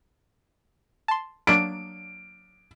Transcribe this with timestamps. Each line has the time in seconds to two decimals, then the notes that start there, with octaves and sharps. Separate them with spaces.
1.08 A5 C6
1.47 F#3 A#3 D4 D7